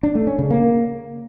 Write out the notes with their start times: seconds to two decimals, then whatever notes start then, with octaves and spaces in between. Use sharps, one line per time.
0.03 D4
0.15 A3
0.27 C#4
0.39 C#3
0.50 A#3